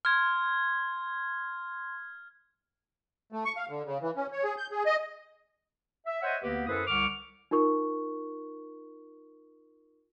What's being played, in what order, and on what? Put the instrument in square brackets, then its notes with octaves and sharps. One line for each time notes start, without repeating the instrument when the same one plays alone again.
[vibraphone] C6 [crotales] F6 G#6
[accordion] A3
C#6
F5
D3
C#3
E3
C#4
C#5
G#4
G6
G#4
D#5
[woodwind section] E5
C5 C#5 D#5 E5 F#5
D2 D3 A#3 B3 G4 B4
F#2 E4 A4 B4 C5 D#6
C2 D3 C#6 D6 F6
[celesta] D#4 F4 A#4 C#6